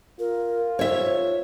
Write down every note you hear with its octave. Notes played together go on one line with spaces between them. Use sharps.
F4 A#4
C5 C#5 E5